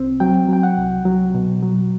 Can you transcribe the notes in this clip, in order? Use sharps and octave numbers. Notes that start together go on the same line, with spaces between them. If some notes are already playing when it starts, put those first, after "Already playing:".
Already playing: C2 C4
F#3 G5
F#3 G5
F#5
C2
F#3
B2
F#3